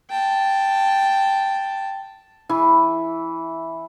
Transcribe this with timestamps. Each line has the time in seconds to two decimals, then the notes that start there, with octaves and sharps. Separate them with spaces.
0.10 G5 A5
2.49 E3